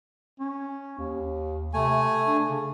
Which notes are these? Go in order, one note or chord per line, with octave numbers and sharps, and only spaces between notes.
C#4
D#2
C3 A3 G#5
D4
C#3